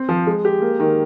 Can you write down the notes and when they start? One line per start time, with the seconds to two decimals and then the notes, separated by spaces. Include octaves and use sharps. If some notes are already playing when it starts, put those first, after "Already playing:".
Already playing: C4
0.09 F3
0.27 G#3
0.45 G4
0.62 A#3
0.80 D#3